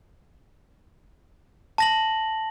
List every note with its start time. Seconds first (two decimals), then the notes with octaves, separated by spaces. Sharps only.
1.78 A5 A#6 F#7